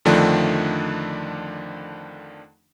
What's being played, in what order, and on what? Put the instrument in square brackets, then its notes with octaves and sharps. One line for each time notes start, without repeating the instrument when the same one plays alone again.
[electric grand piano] F2 D3 D#3 F3 A3 D4